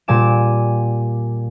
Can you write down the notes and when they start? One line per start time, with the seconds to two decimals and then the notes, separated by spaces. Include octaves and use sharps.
0.08 A#2 G3 G#5 D6 E7